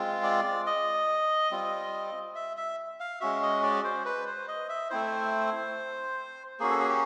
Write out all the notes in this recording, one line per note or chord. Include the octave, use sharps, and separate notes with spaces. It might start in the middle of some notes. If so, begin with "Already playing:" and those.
Already playing: G#3 C4 F4
D5
D#5
G3 C4 F4
E5
E5
F5
G#3 C#4 F#4 E5
D#5
D5
C5
B4
C5
D#5
E5
A3 C4 E4 C5
A#3 C#4 F#4 G#4
A4
G#4
G4